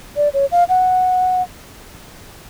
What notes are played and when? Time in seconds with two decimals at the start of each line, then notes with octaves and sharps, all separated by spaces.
0.16 D5
0.34 C#5
0.52 F5
0.69 F#5